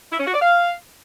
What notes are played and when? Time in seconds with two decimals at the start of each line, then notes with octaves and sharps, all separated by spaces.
0.12 E4
0.19 C#4
0.26 F#4
0.34 D5
0.41 F5